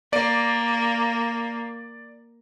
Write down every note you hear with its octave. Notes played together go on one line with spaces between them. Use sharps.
A#3 D5